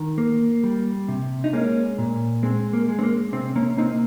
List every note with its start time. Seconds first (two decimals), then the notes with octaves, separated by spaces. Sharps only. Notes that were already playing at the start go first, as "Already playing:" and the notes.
Already playing: D#3
0.18 A#3
0.64 G3
1.08 C3
1.44 D#4
1.53 G#3 A#3 C#4
1.98 A#2
2.43 G#3 C4
2.73 A#3
2.88 G#3
2.99 C4
3.03 A#3
3.32 C3 C4
3.56 A#3 C#4
3.78 A#3 C4 D#4